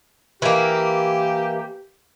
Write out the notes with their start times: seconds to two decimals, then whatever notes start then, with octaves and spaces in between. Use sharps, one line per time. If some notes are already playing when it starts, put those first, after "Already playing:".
0.42 E3 A#3 G4